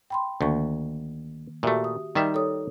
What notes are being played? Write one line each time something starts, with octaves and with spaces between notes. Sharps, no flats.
G5 B5 C6
D2 D#3 A#3 C#6
A#2 A3 F#4 G4 E5
D#6
D#3 G3 D#4 E5
A4 C#5 D#6